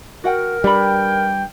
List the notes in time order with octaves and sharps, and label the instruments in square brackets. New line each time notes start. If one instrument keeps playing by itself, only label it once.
[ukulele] F#4 F#5 G5 [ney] A#4
[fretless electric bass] G3 [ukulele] D4 B4 B5 [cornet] G5